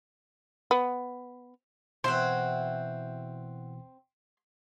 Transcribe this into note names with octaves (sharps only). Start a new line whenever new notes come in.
B3
B2 E3 C4 E4 F#4 C5 F#5 C6